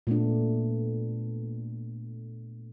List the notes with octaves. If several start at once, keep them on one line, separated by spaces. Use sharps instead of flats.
A#2 A3 B3 D4